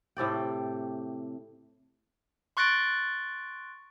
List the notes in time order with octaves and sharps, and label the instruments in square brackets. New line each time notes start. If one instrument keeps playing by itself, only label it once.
[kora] A2 C3 D5 G5
[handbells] C6 C#6 F#6 A6 A#6 D7